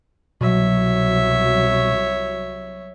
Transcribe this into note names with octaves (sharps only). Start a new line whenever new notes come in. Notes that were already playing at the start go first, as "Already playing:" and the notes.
C2 B2 F#3 C#5 E5